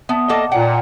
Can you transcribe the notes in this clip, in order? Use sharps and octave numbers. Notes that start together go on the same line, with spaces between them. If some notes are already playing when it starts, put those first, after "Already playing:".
B3 E5 A5
A#3 A4 D#5 F#5 A5 D6
A#2 F#5 G5